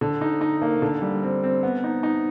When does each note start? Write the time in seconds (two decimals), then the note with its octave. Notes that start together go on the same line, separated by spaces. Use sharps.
0.01 D3
0.21 D#4
0.41 D#4
0.62 A#3
0.82 D3
1.02 G3
1.23 C4
1.43 C4
1.63 B3
1.84 D#4
2.03 D#4